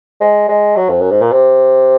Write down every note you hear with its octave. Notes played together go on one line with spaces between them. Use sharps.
G#3
G#3
F#3
F2
F#2
G#2
A#2
C3